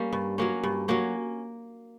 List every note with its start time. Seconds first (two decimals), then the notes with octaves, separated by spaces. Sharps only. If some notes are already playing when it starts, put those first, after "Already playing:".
Already playing: G3 A#3 C#4
0.13 G2
0.38 F#3 A#3 C#4
0.63 G2
0.88 F#3 A#3 C#4